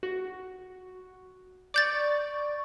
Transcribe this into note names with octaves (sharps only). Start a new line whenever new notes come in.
F#4
D5 C#6 D6 G6 A6